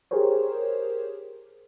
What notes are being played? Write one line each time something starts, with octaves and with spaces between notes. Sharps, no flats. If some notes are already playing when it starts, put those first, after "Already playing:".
G4 G#4 A#4 C5 C#5